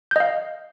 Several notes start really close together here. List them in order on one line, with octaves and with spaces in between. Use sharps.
G6 D#5 F5